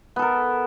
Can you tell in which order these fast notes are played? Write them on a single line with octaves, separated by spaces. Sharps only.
B3 A4 A#4